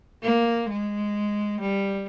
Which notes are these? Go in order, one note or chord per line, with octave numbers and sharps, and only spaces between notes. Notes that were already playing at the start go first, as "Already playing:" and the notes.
A#3
G#3
G3